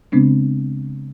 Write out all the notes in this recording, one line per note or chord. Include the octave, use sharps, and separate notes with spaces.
C#3 G#3 B3 C4 D4